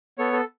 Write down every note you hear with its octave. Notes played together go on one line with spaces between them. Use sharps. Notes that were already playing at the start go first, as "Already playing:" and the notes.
B3 A4 C#5
A4